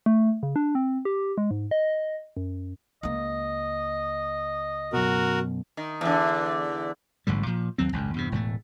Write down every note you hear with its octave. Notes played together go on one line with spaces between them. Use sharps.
A3
C#3
D4
C4
G4
G#3
G#2
D#5
F#2
C#2 A#3 D#5
F#2 B2 F#4 A#4
D#3
E2 D3
A1 G#2 D3 G3
A#2 F3
D#2 F#3 C4
G#1 C#2 F#2
E2 G2 C3
E1 A2 A3